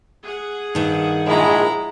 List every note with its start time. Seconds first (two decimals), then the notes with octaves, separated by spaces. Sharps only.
0.24 G#4 F#5
0.75 G2 D#3
1.26 A#1 G#3 E4 A#5